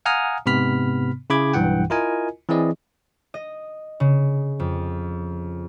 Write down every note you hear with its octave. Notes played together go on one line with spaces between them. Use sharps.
F5 F#5 G#5 A#5 D#6 F6
G#2 C3 B3 B5 F6 B6
C#3 E4 G#4 B5 D6 G#6
B1 G2 E3 F#5 G5
E4 F4 A#4 D#5 G#5
E3 C4 E4 G#4 D5 D#5
D#5
C#3
F2